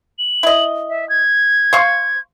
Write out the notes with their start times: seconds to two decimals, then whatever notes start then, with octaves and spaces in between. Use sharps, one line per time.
0.19 F#7
0.43 E4 D#5
0.89 E5
1.09 G#6
1.73 C5 F5 C#6